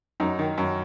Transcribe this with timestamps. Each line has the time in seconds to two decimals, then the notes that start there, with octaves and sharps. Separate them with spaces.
0.20 F#2 D#4
0.39 D#3
0.58 F#2